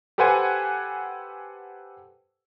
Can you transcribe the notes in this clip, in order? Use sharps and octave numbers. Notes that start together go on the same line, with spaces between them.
G4 A4 B4 C5 F#5 G#5